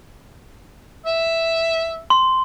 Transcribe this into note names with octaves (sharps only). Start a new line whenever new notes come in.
E5
C6